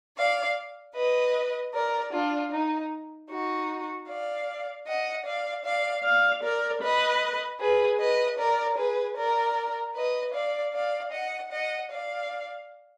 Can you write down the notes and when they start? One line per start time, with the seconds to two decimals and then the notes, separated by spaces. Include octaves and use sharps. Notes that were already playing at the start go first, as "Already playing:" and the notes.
0.16 D5 F5
0.95 B4 D#5
1.73 A#4 D5
2.12 D4 F4
2.51 D#4
3.29 D#4 F#4
4.07 D5 F5
4.86 D#5 F#5
5.25 D5 F5
5.64 D5 F5
6.03 D5 F5
6.42 A#4 D5
6.81 B4 D#5
7.59 G#4 B4
7.99 B4 D#5
8.38 A#4 D5
8.77 G#4 B4
9.16 A#4 D5
9.94 B4 D#5
10.33 D5 F5
10.73 D5 F5
11.12 D#5 F#5
11.51 D#5 F#5
11.89 D5 F5